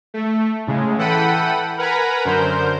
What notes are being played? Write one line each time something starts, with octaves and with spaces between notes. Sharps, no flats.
A3
A2 C#3 G#3
E3 A4 F#5 G5 B5 D#7
A#4 B4 F#5 G#5 A#5 B5
F#2 D3 A#4 C5 G6